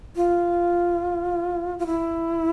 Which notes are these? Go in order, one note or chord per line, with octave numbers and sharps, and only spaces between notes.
F4
F4
E4